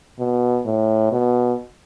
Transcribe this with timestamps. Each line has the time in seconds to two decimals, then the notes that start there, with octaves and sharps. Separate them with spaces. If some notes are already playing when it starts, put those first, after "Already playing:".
0.19 B2
0.66 A2
1.12 B2